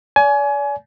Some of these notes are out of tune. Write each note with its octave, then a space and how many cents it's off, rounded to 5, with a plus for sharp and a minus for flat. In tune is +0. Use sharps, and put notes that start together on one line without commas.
D5 -40 G#5 +25